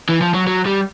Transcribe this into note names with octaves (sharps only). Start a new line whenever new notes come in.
E3
F3
F#3
F#3
G3